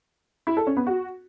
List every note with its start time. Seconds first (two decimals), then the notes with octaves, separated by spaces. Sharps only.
0.47 E4
0.57 A4
0.67 C#4
0.77 B3
0.87 F#4